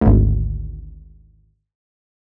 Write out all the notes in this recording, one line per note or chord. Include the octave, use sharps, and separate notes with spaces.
G#1 D2